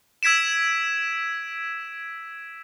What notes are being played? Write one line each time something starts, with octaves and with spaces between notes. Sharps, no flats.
E6 G#6 B6 D7 E7